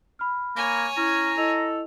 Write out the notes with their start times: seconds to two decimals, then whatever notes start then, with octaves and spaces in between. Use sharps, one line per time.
0.19 B5 F6
0.56 A#3 C#5 G#5 A#5
0.97 C#4 E4 A#5
1.38 E4 A4 D#5 F7